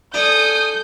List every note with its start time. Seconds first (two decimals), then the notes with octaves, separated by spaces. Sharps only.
0.14 D4 A4 G#5 D#6 G6